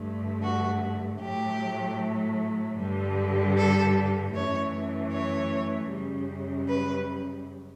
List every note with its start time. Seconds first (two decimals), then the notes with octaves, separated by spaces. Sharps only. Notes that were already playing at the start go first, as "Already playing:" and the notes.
Already playing: G2 D3 A3
0.43 F#4
1.21 A2 F#3 A3 G4
2.78 G2 D3 G3
3.56 A4
4.34 F#2 E3 A3 C#5
5.12 C#5
5.90 F#2 C#3 G3
6.68 B4